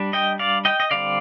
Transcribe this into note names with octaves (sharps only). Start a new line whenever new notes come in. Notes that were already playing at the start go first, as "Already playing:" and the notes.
Already playing: G3 D4
D#5 G5
D5 F5
D#5 G5
D#5
D3 G3 C4 D5 F5